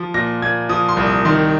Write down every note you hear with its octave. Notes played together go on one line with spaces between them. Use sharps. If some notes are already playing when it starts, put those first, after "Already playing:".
Already playing: F3
A#2 A#6
A#2 G#6
F3 D#6
C6
C2
D#6
D#3 C6